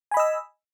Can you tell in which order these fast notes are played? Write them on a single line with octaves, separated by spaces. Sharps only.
G#5 B5 D#5 E6